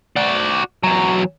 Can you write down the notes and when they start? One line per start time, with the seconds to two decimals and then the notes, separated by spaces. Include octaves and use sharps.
0.16 F#4 D5
0.83 E2 F#3